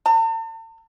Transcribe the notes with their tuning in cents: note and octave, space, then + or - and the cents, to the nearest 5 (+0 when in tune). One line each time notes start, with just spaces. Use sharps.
A5 +45